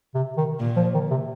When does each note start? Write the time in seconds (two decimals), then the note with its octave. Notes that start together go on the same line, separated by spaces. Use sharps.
0.15 C3
0.37 D#3
0.60 A#2
0.77 F3
0.94 D#3
1.11 C3